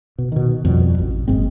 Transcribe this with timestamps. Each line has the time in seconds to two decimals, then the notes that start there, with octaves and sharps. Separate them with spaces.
0.18 B2
0.32 B2 D#3
0.65 F2 B2 G3
0.99 A1
1.28 F#1 G#2 C4